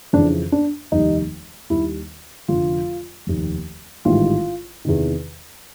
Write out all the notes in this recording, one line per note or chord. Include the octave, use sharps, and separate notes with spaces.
F2 C#3 E3 D4
D4
F1 D#2 D#3 G3 D#4
D#2 D#3 G3 E4
F1 F2 D3 F3 F4
F1 D#2 D#3
A1 G#2 D#3 G3 F4
E2 C3 D#3